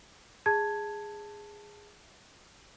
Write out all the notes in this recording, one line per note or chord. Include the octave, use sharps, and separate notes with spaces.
G#4 A5 G#6